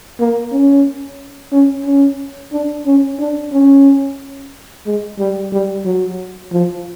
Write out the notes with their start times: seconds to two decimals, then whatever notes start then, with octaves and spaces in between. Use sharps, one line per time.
0.20 A#3
0.52 C#4
1.52 C#4
1.85 C#4
2.52 D4
2.86 C#4
3.19 D4
3.52 C#4
4.86 G#3
5.19 G3
5.52 G3
5.85 F#3
6.52 F3